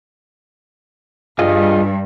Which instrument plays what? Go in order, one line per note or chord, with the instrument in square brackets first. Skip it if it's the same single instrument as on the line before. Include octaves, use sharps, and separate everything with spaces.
[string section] G2 [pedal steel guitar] F4 G#4 D#5